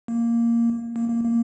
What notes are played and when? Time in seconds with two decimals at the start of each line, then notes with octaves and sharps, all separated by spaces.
0.08 A#3
0.96 A#3
1.10 A#3
1.24 A#3